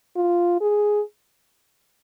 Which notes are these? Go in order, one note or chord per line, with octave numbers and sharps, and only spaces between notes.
F4
G#4